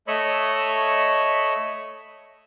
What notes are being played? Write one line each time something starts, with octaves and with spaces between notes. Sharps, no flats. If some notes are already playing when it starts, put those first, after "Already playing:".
A3 C#5 D#5 B5 C#6 E6